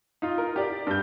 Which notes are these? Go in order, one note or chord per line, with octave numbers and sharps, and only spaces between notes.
D#4 F4
A#4
G4 D5
G2 G6